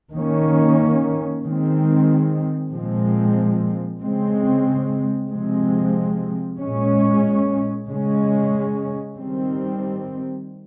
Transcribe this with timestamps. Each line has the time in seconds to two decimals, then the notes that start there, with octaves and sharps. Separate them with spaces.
0.13 D#3 A#3 C#4
1.42 D#3 G#3 C4
2.71 A#2 F3 G#3 C4
4.00 C#3 G#3 C4
5.30 C3 F3 G#3 C4
6.58 A#2 G#3 C#4
7.87 C#3 G#3 C#4
9.16 D#3 G3 C4